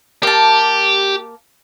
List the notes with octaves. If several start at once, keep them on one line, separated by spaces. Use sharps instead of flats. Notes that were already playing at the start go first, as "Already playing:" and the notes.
A#3 G4 A5